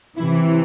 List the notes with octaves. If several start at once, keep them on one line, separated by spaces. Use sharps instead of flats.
C3 E3 E4